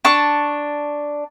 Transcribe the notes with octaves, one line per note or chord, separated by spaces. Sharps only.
D4 A5 C#6